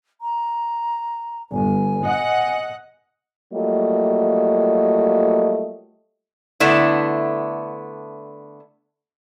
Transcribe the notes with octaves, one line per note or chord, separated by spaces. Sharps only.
A#5
G1 G#5
D#5 F#5
F#3 G3 A3 A#3 F4 D#5
D3 A3 B3 D4 E4